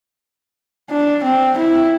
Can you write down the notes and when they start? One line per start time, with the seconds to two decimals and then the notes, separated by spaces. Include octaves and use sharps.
0.90 D4
1.24 C4
1.58 E4